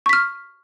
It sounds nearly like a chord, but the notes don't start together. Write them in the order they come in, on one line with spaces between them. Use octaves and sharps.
C#6 B6 F6